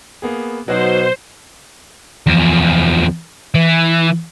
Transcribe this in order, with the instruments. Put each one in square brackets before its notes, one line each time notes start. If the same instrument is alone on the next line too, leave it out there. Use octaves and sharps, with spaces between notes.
[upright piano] A#3 B3 G#4
[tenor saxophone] B2 [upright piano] F#3 D#4 F#4 [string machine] C5
[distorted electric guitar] E2 F3
E3